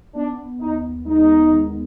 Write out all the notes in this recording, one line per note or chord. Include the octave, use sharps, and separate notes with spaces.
B3 D4
D#2 D#4
G#3 D#4
D#3